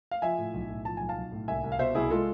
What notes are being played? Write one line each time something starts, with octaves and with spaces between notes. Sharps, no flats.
F5
F3 E5 G#5
A2
B1
A2
F3 A5
B1 G#5
F5 A5
B1
A2
C2 E5 G#5
C2
F5
B2 C5 E5
C2 E4 G#4
G#3 F4 A4